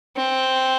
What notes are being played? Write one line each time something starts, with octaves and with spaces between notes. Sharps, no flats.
C4